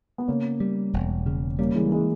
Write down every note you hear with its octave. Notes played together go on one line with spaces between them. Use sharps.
B3
C#3 A#3 C#4
G3
E1
C#3
G3 A#3 C#4
E3 G#3
A#3
E3 G#3